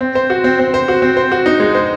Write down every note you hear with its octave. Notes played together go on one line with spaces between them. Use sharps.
C4
C5
F#4
C4
C4
C5
F#4
C4
C5
F#4
D#4
G#3
C5